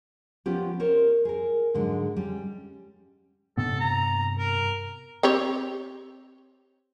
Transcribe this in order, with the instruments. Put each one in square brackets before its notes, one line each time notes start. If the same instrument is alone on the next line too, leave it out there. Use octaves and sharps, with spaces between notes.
[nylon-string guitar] F3 B3 C#4 F4 G4
A#4 C5 C#5
G#4 A#4
G#2 D3 F#3 G#3
G3 C#4
[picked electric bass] G2 C3 B3 [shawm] A4
[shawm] A#5
A#4
[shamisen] C4 G4 C#5